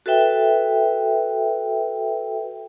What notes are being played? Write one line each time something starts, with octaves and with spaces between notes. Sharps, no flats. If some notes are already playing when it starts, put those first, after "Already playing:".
F#4 A4 B4 E5 G5